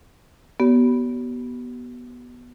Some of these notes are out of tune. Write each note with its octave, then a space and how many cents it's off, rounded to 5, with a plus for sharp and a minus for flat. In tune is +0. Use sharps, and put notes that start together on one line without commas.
B3 -10 G4 -45 C#5 +45